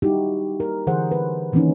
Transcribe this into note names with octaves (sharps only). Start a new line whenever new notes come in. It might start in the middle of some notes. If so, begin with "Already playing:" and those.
G3 D#4 E4 F#4 G4
A#4
D3 E3 G#4 C5 F#5
B4
D#3 E3 A#3 C4 C#4 D#4